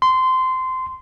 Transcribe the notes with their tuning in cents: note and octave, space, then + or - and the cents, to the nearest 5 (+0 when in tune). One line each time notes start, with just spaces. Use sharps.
C6 -20